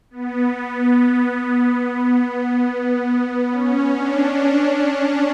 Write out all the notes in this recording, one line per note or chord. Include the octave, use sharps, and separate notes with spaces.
B3
C#4
D4
D4